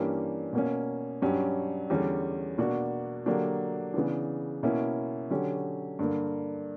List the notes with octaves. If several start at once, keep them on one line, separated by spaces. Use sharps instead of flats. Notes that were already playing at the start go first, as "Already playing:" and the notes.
Already playing: G2 E3 A#3 C#4 G4
B2 A#3 C#4
G2 F#3 C#4 G4
E2 D3 G3 C#4
B2 A#3 D4 F#4
D3 F#3 A#3 D4 G4
C#3 E3 B3 D4
B2 A#3 C#4 E4
D3 F#3 C#4 G4
G2 D3 A#3